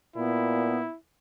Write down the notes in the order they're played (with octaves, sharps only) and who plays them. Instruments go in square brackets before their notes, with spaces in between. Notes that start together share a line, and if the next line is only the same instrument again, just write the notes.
[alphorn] A#2 [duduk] B3 [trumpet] E4